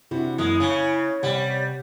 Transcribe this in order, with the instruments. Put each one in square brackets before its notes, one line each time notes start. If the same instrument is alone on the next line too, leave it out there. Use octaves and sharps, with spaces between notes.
[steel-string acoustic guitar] C3 D4 F#4 [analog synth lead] E4 [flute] F#5
[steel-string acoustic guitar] F#2 A#3 F5 [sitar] G#3 [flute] D#6
[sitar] C#3 [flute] C#5 [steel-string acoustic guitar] G#5
[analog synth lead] C3 [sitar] G3 [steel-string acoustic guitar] F#5